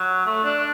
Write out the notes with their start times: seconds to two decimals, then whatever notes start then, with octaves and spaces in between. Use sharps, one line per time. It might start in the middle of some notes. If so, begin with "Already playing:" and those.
Already playing: F#3
0.26 A3
0.44 D4